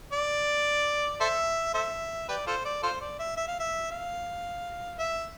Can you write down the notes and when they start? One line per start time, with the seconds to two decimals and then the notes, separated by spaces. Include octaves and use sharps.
0.13 D5
1.21 A4 C5 E5
1.74 A4 C5 E5
2.29 G4 B4 D5
2.47 F4 A4 C5
2.65 D5
2.83 F4 A4 C5
3.01 D5
3.19 E5
3.37 E5
3.48 F5
3.60 E5
3.91 F5
4.99 E5